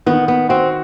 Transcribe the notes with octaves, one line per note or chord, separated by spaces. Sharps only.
D#3 B3
B3
C4 F#4